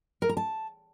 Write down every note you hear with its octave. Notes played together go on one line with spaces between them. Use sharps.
A#4
A#5
A5